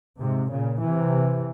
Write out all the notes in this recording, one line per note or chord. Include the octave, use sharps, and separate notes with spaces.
G#2 C3
A#2 C#3
C3 E3